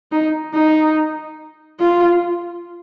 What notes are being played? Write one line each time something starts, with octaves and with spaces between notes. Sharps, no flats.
D#4
D#4
F4